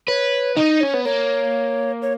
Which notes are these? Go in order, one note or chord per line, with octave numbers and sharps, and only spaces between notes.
B4 C#5
D#4 D#5
C#4 C#5
B3
A#3 C#5
C#5